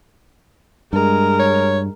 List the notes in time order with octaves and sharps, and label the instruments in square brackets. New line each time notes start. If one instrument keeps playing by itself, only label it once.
[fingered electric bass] G2 [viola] G#3 A#4
[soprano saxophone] C#5